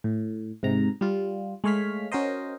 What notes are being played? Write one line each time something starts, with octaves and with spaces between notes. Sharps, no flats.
A2
G#2 C3 A#5
G3 F4
G#3 A3 C#5 F5 F6 B6
C#4 F#4 A#4 C5 D#5